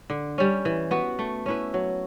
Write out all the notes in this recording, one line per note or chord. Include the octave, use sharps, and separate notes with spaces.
D3
G3 C#4
E3
B3 F#4 B4
A3
C#4 E4 B4
F#3